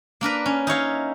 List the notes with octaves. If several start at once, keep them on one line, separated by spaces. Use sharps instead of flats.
A#3 D4 A#4 B4
C#4
D#4 E4 C#5 F5